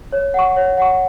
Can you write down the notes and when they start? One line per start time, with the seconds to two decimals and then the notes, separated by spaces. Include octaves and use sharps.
0.12 C#5
0.34 F#5 C#6
0.56 C#5
0.78 F#5 C#6